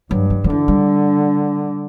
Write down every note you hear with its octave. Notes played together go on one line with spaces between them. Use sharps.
G2 F#3
F#3
F#3
D3 E3
G3